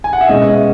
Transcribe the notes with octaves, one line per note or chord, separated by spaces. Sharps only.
G#5
F#5
E5
B2 G#3 C#4 D#5